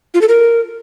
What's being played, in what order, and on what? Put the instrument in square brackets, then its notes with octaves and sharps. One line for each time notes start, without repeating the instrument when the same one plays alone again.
[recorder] F4
A4
A#4